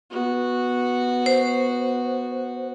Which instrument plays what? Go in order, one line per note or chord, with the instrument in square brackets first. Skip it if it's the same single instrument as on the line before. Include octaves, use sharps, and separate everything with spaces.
[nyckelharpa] B3 F#4
[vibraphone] C5